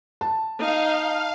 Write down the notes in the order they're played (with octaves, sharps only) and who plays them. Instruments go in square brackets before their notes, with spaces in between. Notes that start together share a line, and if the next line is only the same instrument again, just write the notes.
[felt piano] A5
[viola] D#4 [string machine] F5